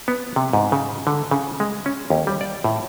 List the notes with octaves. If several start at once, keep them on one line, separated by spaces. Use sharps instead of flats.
B3
C3
G#2
C#3
D3
C#3
G#3
C#4
D#2
G3
D5
A2